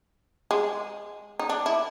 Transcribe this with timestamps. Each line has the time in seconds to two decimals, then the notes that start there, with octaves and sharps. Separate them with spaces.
0.51 G#3
1.39 D#4
1.49 D4
1.66 E4